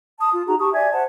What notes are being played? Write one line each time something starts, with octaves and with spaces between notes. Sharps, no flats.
A5 D#6
F4
D#4 F#4 G#4 A#5
G4 A5 C#6 D#6
D5 E5 G#5 G#6
C5 F#5 A5